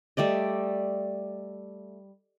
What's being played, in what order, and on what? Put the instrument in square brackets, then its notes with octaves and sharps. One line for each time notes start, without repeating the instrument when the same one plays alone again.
[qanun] G3 A3 D5 D#5